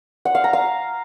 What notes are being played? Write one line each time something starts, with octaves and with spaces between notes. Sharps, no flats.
F#5
F5
A#5
F5